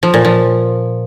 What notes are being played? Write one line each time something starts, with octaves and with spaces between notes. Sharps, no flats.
F3
A#2
F3